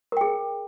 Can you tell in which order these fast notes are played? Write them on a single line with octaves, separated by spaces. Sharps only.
A#4 G5 G#4